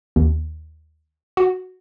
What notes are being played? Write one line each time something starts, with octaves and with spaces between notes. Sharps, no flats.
D#2
F#4